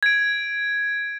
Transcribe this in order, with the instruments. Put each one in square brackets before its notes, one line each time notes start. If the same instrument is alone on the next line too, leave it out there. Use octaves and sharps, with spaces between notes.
[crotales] G#6 D7